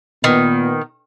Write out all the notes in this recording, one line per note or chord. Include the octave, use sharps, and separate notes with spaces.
A#2 D#3 B3